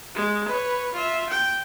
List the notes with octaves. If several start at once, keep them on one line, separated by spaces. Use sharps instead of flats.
G#3
B4 C#5
F4 E5
G5